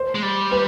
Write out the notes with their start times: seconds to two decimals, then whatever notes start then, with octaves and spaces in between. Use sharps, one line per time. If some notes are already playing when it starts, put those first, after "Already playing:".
Already playing: C5
0.15 G#3
0.23 G3
0.51 B4